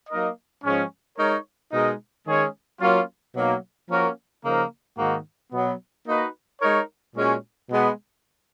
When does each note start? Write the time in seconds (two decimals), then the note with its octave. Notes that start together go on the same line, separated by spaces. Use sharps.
0.10 F#3 A#3 D#4 A#4 D#5
0.63 G#2 F3 G#3 C#4
1.18 G#3 D#4 A#4 C#5
1.72 B2 G#3 D#4 A#4 D#5
2.27 D#3 G#3 C#4 G#4 C#5
2.81 F#3 A#3 C#4 F4
3.35 B2 F#3 A#3 D#4
3.89 F3 A#3 C#4 F#4 A#4
4.43 C#3 F3 A#3 D#4 A#4
4.98 G#2 D#3 A#3 D#4 F#4
5.52 B2 F#3 B3
6.07 A#3 D#4 F#4 B4 D#5
6.61 G#3 D#4 A#4 C#5
7.15 A#2 G#3 C#4 F#4
7.70 B2 G#3 B3